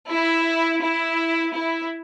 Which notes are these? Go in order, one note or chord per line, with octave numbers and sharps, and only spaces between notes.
E4
E4
E4